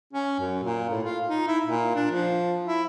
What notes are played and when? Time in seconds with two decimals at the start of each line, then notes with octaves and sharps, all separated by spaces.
0.13 C#4
0.39 F#2
0.63 A#2
0.90 A2
1.04 F4
1.28 D#4
1.47 E4
1.64 A#2
1.95 D4
2.11 F3
2.64 E4